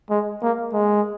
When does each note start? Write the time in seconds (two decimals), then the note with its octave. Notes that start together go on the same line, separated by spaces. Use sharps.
0.10 G#3
0.42 A#3
0.73 G#3